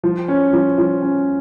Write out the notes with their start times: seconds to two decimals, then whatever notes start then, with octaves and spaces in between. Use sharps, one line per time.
0.03 F3
0.28 C#4
0.53 F3
0.78 F3
1.02 C#4